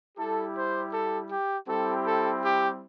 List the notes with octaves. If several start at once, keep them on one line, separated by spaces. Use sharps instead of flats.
G3 E4 G4 A4
C5
A4
G4
G3 C4 E4 G4 A4
A4
G4